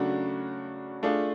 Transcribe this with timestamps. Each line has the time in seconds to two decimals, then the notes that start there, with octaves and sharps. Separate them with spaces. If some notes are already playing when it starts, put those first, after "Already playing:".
Already playing: C#3 F#3 A3 D4 F#4
1.03 A3 D4 F4 G#4